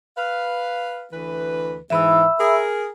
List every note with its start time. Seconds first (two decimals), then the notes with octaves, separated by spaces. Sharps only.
0.17 B4 F5
1.12 D2 E3 B4
1.90 G#2 E3 E5 B5 E6
2.39 G#4 A#4